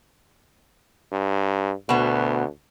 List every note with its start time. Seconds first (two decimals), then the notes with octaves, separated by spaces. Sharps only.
1.12 G2
1.89 D2 B2 B3